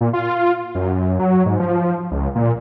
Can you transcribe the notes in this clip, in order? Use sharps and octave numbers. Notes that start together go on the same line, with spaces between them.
A#2
F4
F#2
F#3
G#2
F3
C#2
A#2